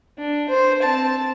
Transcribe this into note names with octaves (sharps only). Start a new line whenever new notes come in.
D4
C5
C4 A5